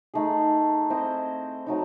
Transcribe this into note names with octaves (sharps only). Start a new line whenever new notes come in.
A3 D#4 G#4
C4 E4 C5 D#5
F#3 A3 D#4